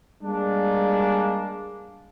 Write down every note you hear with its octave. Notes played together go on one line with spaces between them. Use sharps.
G3 G#3 A#3 D4